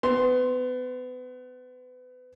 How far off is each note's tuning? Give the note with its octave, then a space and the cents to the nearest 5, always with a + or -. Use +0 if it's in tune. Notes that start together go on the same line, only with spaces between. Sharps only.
B3 +30 C6 +0